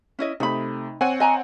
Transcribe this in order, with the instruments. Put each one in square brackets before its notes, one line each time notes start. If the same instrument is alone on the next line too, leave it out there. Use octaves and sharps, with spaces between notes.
[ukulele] C#4 E4 D#5
[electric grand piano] C3 A3 [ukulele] D#4 B5
[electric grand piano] C4 C#5 F#5 [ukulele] G#5
[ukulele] D#5 G#5 A#5